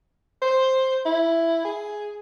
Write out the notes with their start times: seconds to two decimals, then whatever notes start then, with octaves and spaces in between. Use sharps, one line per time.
0.42 C5
1.06 E4
1.65 G#4